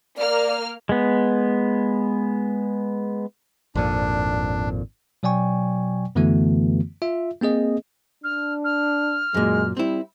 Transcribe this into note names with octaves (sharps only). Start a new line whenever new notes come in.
A#3 D5 F6
G#3 B3
G#1 F2 A#2 D4
B2 F#3 D5 G5 G#5 C#6
F#2 D3 E3 A3 B3 F#4
F4 E5
A#3 C4 G#4 D#5
D4 F6
F6
F#2 A#2 G#3
G3 C4 E4